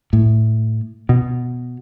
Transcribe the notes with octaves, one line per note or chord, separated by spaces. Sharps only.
A2
B2